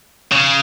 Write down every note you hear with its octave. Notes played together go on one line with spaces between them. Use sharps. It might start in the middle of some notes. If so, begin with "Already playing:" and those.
C#3